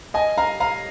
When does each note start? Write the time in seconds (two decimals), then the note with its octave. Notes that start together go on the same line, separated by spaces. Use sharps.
0.14 D#5 G#5
0.38 F5 A#5
0.60 F5 A#5